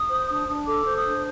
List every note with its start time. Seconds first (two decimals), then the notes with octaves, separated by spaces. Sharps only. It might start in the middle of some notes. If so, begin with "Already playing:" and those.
Already playing: D#6
0.09 C5
0.28 D4
0.47 D4
0.67 A4 D6
0.86 C5
0.96 D#6
1.05 D4